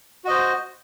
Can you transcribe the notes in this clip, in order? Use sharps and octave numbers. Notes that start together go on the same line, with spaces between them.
F#4 C5 D#5